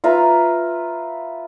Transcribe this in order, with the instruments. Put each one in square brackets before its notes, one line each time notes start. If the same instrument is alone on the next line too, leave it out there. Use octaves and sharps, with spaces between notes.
[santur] F4 B4 E5 A#5